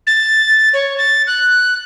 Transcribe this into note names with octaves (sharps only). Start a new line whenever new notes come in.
A6
C#5
A6
F#6